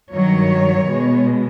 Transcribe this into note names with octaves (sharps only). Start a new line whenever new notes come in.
G2 D#3 F#3 C#5
B2 G#3